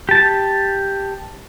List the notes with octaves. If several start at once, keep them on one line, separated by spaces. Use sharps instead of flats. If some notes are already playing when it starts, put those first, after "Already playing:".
G4 A5